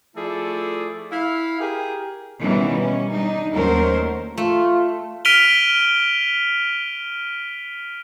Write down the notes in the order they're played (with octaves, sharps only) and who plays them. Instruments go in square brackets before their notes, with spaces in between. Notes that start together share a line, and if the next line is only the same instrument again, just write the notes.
[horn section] F3 A3 E4 G#4 A4 D5
E4 F5
G4 G#4 A#4
[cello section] B2 D#3 E3 G3 C#4
C#4
G3 D4 D#4
D#2 F#3 A3 C#4 A#4 C5
[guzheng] A3 [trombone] F4
[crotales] F6 B6 D7 D#7 F7 G7